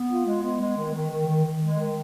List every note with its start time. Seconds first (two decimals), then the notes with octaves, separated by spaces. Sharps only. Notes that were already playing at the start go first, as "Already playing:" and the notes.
Already playing: B3
0.09 F4
0.26 G#3
0.43 B3
0.60 G#3
0.77 D#3
0.94 D#3
1.11 D#3
1.27 D#3
1.45 D#3
1.61 G#3
1.79 D#3